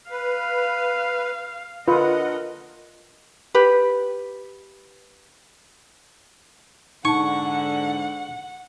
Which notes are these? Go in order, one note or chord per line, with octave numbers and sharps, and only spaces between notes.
B4 F5
D3 F4 A#4 B4 D#5 F#5
G4 B4
G#2 D3 D#4 F#5 A5 C#6